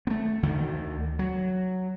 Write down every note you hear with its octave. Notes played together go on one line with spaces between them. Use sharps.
A3 B3
D2 D3 D#3
F#3